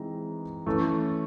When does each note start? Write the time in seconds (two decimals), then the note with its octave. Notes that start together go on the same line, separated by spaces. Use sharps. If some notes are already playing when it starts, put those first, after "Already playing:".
Already playing: E3 G#3 C4 D#4
0.66 E3 A3 C#4